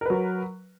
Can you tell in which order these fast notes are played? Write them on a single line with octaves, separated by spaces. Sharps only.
A#4 B4 F#3